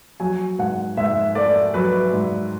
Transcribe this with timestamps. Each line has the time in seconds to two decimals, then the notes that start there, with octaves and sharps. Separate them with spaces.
0.20 F#3 G#5
0.59 G#2 F#5
0.97 G#2 E5
1.35 A3 D5
1.74 F#3 B4
2.13 G#2